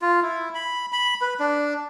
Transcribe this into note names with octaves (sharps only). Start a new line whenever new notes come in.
F4
E4
B5
B5
B4
D4